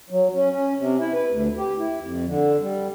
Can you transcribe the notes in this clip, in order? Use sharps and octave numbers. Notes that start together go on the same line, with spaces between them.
F#3
C#4
C#4
C3
E4
B4
D2
G4
E4
F2
D3
G3